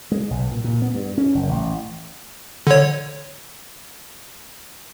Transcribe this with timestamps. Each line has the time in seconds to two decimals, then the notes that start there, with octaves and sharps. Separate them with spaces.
0.12 G#3
0.30 B1
0.51 A#2
0.64 A#2
0.82 B3
0.95 G2
1.18 C#4
1.35 F#1
1.49 A1
2.67 D3 C#5